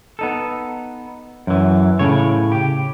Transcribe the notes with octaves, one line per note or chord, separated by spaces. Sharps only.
B3 D#4 A4
F#2 E3
A2 C#3 C#5
G4